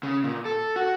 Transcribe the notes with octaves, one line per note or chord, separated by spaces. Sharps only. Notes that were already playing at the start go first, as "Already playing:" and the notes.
C#3
A#2
A4
F#4